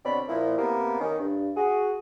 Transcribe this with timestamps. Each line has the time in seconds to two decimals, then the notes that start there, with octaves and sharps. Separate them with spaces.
0.05 B2 D3 C4 C#5 D5 B5
0.29 A#2 F3 E4
0.58 C3 A#3 B3 G4 A#4
1.00 D#3 C#4
1.20 G2
1.57 F#4 G#4